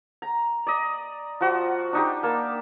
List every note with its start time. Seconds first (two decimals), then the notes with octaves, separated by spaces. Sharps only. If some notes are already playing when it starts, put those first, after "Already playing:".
0.22 A#5
0.67 D5 D#5
1.41 F3 F#4
1.93 D4 D#4 G4
2.23 A#3 A5 B5